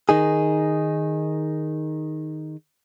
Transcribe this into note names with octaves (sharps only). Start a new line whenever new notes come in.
D#3 D#4 G#4